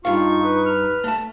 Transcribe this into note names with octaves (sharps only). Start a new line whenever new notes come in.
G2 D#4 F4 F5 C#6
B4
F6
A3 A5